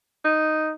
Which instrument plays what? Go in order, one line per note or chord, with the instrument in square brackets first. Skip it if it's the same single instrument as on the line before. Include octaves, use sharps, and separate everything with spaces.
[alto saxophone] D#4